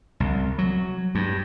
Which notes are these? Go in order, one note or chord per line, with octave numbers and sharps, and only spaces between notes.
C2
F#3
G2